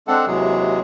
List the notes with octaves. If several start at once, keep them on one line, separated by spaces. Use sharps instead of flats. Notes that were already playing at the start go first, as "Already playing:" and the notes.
G#3 C4 D4 A4 F#5
D#2 C3 E3 F#3 G#3 G#4